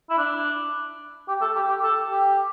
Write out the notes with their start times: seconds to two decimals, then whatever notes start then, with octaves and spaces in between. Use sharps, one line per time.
0.10 E4
0.18 D4
1.28 G4
1.41 A4
1.56 G4
1.69 G4
1.83 A4
2.10 G4